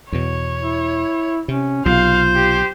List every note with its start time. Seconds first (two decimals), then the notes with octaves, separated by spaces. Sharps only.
0.12 E2 B2 C#5
0.63 E4
1.48 C3 C#4
1.86 B1 C3 F4 C5 F5
2.35 G4